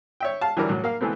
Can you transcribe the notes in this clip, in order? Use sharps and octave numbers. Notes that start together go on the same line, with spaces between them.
C#5 E5 G5
F5 A5
E3 F#3 G3 D4 A#4
A2 F#3
A#3 F5
E3 G#3 A3 B3 C4